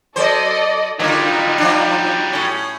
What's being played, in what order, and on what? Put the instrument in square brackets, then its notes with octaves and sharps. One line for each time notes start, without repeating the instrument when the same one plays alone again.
[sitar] F#3 C5 [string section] A4 D5 D#5
[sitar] D3 A#3 [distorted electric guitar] F#3 G3 [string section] D#4 F4
[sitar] F3 D4
A2 C#4